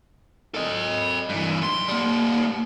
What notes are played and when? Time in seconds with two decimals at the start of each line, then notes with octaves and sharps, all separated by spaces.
0.54 A4 D#5
1.29 G2 E3
1.62 F#2 C6
1.88 G3 A#3